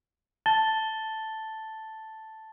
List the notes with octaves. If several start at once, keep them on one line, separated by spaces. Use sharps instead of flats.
A5 A6 G7